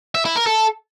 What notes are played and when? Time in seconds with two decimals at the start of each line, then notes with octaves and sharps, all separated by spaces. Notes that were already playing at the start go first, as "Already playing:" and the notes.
0.15 E5
0.25 E4
0.36 A#4
0.46 A4